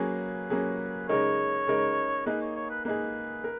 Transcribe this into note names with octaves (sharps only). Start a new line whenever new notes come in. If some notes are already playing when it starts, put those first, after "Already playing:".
Already playing: F#3 A#3 C#4 G#4 B4
F#3 A#3 C#4 G#4
C#3 G#3 D#4 A#4 C#5
C#3 G#3 D#4 A#4
A#3 D#4 G#4 B4
C#5
C#5
B4
A#3 D#4 G#4 B4
A#4